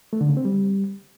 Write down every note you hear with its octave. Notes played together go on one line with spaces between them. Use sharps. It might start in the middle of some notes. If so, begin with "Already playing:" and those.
A3
D3
C#3
C4
G3